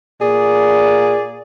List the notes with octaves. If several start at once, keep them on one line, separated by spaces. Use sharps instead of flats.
A#2 G#4 D5